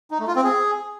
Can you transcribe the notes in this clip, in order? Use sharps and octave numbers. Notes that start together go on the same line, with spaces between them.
D#4
A3
F4
C4
G#4